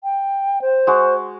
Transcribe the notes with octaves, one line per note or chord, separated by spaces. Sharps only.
G5
C5
G#3 F#4